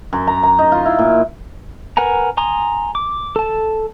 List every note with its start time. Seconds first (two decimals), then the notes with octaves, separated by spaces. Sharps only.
0.13 F#2
0.27 A#5
0.43 A#5
0.59 D#4
0.72 F4
0.85 E4
0.99 A#2
1.97 A#4 B4 F#5 G#5 A#5
2.37 G#5 A#5 C6 D#6
2.95 D6
3.36 A4 A5